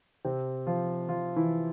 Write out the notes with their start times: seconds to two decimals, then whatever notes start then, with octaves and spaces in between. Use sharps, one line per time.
0.25 C3 C4
0.67 F3 F4
1.08 F3 F4
1.36 E3 E4